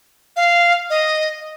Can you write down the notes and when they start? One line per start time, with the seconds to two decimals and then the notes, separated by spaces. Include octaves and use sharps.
0.36 F5
0.90 D#5